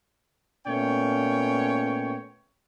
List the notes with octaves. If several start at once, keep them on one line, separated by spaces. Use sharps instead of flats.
A#2 A3 B3 C#4 C#5 G5